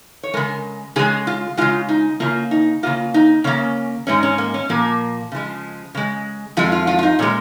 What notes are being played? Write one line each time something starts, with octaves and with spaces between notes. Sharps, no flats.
C#5
C#3 G#3 A#4
C#3 G#3 G#4
F4
C#3 G#3 F4
D#4
C#3 A#3 F4
D#4
C#3 A#3 F4
D#4
C#3 A#3 C#4
G#2 G#3 C#4
C#4
A#3
C#4
A#2 F3 A#3
C#3 F3 G#3
C#3 G#3
F2 F3 G#3 F4
F4
F4
F4
D#4
A#2 G#3 C#4